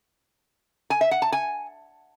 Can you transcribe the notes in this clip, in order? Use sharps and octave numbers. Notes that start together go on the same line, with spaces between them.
G#5
E5
F#5
A5
G#5